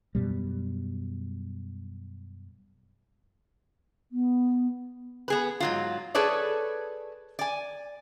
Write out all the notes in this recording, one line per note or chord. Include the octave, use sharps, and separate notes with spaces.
F#2 B2 G3
B3
B3 G#4 B4
G#2 F#3 F4
G#4 A4 B4 C#5 D5
D5 G#5